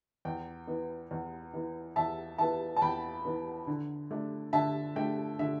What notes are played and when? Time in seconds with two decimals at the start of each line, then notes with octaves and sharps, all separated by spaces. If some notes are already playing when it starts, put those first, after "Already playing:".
0.25 E2 G5
0.67 E3 B3
1.11 E2
1.54 E3 B3
1.96 E2 E5 A5
2.38 E3 B3 E5 A5
2.77 A5
2.82 E2 G5 B5
3.25 E3 B3
3.67 D3
4.11 A3 D4
4.53 D3 E5 A5
4.96 A3 D4 G5
5.39 D3 E5